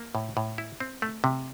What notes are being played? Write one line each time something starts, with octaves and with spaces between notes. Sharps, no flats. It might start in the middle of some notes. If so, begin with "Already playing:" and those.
Already playing: A#3
A2
A2
E4
C4
A3
C3